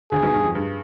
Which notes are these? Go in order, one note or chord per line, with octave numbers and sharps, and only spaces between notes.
D2 D3 G#4
B1 B2
G2
F2
G2